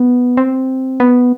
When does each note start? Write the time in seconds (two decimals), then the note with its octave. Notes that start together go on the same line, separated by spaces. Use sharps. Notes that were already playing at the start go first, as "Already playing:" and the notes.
Already playing: B3
0.37 C4
1.00 B3